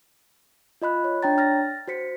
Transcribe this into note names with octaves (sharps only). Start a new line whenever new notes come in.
F4 D#5 B5 F#6
C#5
D4 C#5 G5 A#5 A6
F6 A6 A#6
F#4 C5 B6 C#7